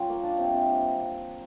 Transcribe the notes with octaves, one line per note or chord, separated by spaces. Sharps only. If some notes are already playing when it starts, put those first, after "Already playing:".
Already playing: G3 C#4 F4
A#3
D4
C3
C3